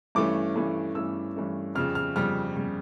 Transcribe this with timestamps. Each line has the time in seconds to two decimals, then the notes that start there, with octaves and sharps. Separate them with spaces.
0.15 G2 E3 A3 C#4 D6
0.56 G2 E3 A3 C#4
0.95 G2 E3 A3 C#4 E6
1.36 G2 E3 A3 C#4
1.75 F2 C#3 G3 F6
1.95 F6
2.16 F2 C#3 G3 F6
2.57 C#3 G3